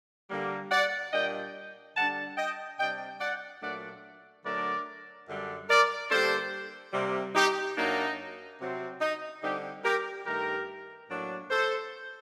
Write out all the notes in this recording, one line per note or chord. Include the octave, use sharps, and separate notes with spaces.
D3 G3 A#3
D5 F#5
A#2 G3 D4 D#5 G5
D3 G3 D4 F#5 A5
D#5 G5
C3 G3 D4 D#5 G5
D5 F#5
A#2 F#3 A3 D4 D5 F#5
D3 F#3 A3 D4 A#4 D5
F#2 D3 G3 D4
A#4 D5
D3 G3 A#3 D4 A4 C5
C3 G3 A#3
D#4 G4
F#2 F#3 A#3 D4 D#4
C3 F#3 C4
D#4
D3 G3 C4 D#4 G4
G4 A#4
G2 D#3 A3 G4 A#4
A2 F#3 A#3 D4
A4 C5